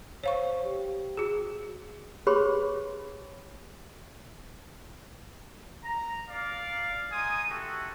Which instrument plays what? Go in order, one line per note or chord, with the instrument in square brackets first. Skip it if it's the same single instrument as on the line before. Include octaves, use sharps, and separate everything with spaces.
[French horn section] C5 [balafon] C#5 F5 C#6
[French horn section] G4
[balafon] F#4 G#4
[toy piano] G4 G#4 B4 C#5 B5 C6
[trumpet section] A#5
D5 F5
D#4 G#5 C6 D#6
A3 F#4 G4 A4